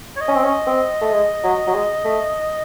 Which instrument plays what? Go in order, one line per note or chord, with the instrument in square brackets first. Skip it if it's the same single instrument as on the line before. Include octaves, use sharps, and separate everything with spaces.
[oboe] C#5
D#5
[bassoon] C#4
C4
C#4
C4
A3
G#3
F#3
F#3
G#3
A3